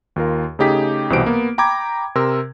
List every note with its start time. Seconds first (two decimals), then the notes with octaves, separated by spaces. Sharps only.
0.16 D#2 F4 A#4
0.59 C#3 A3 D#4 G4 G#4 B6
1.10 C2 B2 E3 G4 C5 D7
1.26 A#3 B3
1.58 G5 A#5 B5 D6 G#6
2.15 C3 A#4 C6 E6